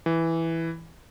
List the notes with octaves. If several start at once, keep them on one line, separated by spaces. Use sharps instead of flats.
E3